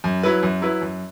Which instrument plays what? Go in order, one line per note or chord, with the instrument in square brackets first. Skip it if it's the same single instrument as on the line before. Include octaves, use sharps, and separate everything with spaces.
[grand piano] F#2
F#3 E4 B4
F#2
F#3 E4 B4
F#2